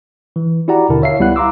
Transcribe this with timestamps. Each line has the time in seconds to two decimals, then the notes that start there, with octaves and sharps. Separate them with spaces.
0.36 E3
0.68 E4 F#4 G4 D5 F#5 A#5
0.89 D#2 B2 D3 E4 A#4 A5
1.02 C#5 E5 F5 C7
1.19 C#2 G3 B3 E4 F#5 F#6
1.36 F5 A#5 C6 D6 E6